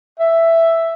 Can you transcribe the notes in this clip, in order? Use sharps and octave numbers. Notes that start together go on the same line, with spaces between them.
E5